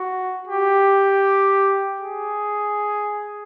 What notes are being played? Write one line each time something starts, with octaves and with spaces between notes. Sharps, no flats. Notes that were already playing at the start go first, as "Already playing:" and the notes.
Already playing: F#4
G4
G#4